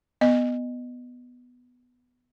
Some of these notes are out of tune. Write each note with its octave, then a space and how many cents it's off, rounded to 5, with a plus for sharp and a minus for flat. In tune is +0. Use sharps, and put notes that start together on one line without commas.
B3 +0 D#5 -15